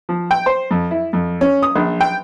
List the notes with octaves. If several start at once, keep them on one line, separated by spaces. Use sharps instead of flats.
F3
G5
C5
F2
E4
F2
C#4
D#6
A#1
G5